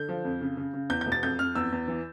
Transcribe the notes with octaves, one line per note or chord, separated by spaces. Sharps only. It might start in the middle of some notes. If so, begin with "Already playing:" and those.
Already playing: D3 G6
F3
F2
C#3
C#3
C#3
E2 G6
G6
E1
A6
F2 G6
F2 F6
E2 E6
E2
E3